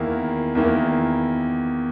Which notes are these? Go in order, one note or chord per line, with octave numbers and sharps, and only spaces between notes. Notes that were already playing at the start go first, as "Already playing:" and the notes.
Already playing: E2 D#3 A#3 E4
E2 D#3 A#3 E4